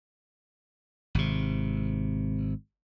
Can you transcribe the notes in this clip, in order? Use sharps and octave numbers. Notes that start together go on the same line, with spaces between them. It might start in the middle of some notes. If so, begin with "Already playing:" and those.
G#1 C3